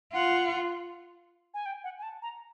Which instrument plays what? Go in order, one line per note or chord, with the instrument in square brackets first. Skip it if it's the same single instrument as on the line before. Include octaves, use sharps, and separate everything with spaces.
[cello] F4 [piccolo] F#5
[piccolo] G#5
G5
F#5
G#5
A5
A#5